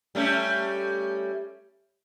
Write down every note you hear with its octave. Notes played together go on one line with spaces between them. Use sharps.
G3 A3 C#4